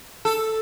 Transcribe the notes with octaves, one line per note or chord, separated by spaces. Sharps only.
A4